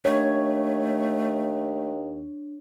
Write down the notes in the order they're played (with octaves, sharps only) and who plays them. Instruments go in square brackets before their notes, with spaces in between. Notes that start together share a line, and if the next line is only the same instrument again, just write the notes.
[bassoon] D#2 [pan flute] A3 [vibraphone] D4 [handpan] C#5